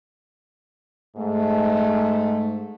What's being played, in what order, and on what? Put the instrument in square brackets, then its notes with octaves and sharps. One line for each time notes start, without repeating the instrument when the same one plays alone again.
[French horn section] G#2 A3